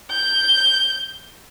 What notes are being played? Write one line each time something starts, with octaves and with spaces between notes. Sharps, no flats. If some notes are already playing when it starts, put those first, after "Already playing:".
G6